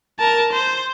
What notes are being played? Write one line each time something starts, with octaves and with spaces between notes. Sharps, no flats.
A#4 A5
C5